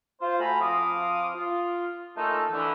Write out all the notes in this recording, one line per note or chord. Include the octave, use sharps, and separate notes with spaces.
F4 C5
A3 F#4 G#5 A#5 B5
F3 C4 F5 C6 D6 D#6
F4
A3 A#3 C#4 D#4 F4 A4
D3 E3